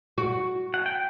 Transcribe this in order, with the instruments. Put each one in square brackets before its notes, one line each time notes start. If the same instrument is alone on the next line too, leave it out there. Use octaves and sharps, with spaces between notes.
[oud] F#4
[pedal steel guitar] F#5
G5